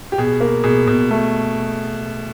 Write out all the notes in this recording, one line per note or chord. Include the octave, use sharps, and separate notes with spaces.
G4
B2 G#4
A#3
B2 G#4
B2
A3